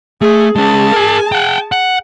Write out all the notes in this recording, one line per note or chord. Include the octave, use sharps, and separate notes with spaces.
A3 G#4
G#3 C#4 G#4 A5
A#4 G#5
F#5 G5
F#5